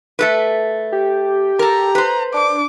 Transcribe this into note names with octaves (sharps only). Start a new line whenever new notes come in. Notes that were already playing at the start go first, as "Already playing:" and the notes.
A3 A4 B4
G4
A4 A#4 A#5
B4 C5
D4 D6